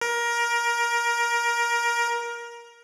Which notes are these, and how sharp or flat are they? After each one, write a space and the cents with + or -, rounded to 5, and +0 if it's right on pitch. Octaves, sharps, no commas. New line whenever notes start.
A#4 +20